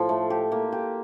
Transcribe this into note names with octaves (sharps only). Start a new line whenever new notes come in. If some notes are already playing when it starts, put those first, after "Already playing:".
Already playing: A2 F3
A3
G4
A#3
G4